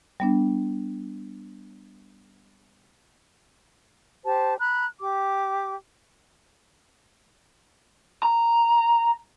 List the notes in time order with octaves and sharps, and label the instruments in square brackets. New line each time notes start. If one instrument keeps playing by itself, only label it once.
[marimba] G3 B3 D4
[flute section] G4 C5 A5
A#5 B5 F#6
G4 D6
[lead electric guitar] A#5